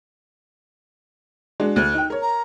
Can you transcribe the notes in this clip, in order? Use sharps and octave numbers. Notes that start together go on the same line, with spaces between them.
G#3 D4 F#4
D2 F6 F#6
D#4 G5
A#4 C#5
A#5